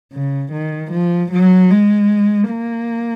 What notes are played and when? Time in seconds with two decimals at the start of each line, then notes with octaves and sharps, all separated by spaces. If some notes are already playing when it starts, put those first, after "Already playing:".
0.13 C#3
0.52 D#3
0.92 F3
1.31 F#3
1.70 G#3
2.50 A#3